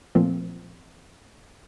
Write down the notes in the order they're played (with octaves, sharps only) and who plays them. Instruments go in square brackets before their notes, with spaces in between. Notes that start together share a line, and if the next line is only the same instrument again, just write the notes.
[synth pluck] A#2 F3 A3 C4